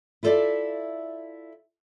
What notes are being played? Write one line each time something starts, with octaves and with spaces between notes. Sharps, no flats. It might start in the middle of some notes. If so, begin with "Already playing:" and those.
E4 F4 A4 C#5 D5 E5